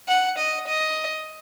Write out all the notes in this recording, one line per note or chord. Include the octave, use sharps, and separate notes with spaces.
F#5
D#5
D#5